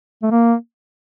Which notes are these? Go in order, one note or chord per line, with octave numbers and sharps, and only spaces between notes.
A3
A#3